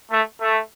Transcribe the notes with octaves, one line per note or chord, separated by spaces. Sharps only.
A3
A3